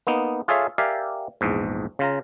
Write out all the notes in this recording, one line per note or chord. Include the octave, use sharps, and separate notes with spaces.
A#3 B3 D#4
F4 G#4 A4 C#5 E5 F5
G4 A#4 D5 E5 F5 G#5
A#1 E2 G#2
C#3 F4 A#5